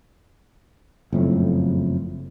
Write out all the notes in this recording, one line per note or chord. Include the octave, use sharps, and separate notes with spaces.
F#1 F2 A2